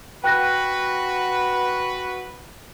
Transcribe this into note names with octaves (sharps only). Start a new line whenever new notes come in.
F#4 B4 G5 F#6 A#6